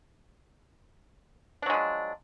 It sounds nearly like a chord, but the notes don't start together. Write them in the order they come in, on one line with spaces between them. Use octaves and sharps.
D4 F#3 G#3 F3